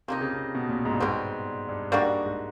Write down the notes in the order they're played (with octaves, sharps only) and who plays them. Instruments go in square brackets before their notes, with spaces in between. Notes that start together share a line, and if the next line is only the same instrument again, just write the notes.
[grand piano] C3 [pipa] F3 A#3 D#4
[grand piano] C#3
C3
B2
A#2
G#2
G2
[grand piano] G#2 [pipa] B2 G3 C4
[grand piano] G2
[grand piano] G#2 [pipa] G3 A#3 D4 F#4
[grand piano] G#2